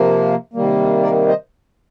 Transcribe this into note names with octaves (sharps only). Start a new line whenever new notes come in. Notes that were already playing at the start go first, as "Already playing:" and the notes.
Already playing: C3 F3 A#3
C3 D#3 G3 A#3
A#4 D5
C5 D#5